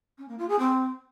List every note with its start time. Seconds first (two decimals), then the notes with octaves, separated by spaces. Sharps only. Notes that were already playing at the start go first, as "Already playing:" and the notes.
0.18 C#4
0.28 A#3
0.38 F4
0.48 G#4
0.58 C4